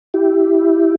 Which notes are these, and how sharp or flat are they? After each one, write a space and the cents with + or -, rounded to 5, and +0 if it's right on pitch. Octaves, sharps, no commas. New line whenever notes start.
E4 +0 G4 -10